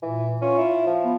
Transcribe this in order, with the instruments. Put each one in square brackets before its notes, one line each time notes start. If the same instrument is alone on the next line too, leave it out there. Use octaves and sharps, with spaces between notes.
[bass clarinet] A#2 [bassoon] E3
[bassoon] C#4 [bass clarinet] F4
[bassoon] E4
F3
[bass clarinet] B3